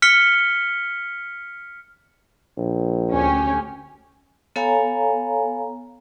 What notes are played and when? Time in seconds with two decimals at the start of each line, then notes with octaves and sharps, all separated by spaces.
0.02 F6 B6 C#7 G7
2.57 A#1
3.09 D2 C#4 G4
4.56 B3 A4 C#5 F5 G#5 A#5